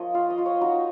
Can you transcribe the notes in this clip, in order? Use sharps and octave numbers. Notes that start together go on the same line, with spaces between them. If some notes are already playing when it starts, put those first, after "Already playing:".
Already playing: F3 A#3 C#5 D#5
F4 F5
D#5
F4
C#5
D#4 F#4